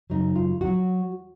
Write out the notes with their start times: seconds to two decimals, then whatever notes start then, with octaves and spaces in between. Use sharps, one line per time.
0.10 F#2 C#3 F#3 D#4
0.36 F4
0.61 F#3 F#4